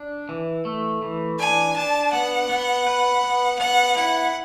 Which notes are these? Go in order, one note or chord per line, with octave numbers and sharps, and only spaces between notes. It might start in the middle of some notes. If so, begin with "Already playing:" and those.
Already playing: D4
E3
A3
E3
D4 G#5
D4 A5
B3 F#5
B3
B4
B3
B3 F#5
E4 F#5